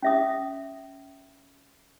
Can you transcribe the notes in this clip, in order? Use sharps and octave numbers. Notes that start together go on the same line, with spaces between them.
C#4 E5 D#6